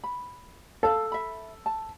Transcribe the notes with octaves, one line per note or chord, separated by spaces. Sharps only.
B5
A4 F5 A5
E5 B5
A5